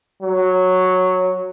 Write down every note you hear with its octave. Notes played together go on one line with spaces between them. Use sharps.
F#3